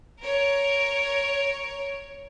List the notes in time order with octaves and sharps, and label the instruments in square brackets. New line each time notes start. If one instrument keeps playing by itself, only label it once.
[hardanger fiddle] A#4 [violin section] C#5